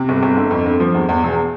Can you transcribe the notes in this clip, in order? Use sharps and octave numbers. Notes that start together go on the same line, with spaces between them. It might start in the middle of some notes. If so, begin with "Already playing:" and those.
Already playing: C3
G1
G1
D3
F2
D3
F3
E2
E2
E1